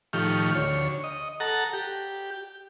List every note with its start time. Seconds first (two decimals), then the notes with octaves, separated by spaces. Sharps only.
0.13 A2 D#3 F3 G4 C#6 F6
0.55 D2 C#5
1.04 D#5
1.40 A4 F#5 A#5
1.73 G4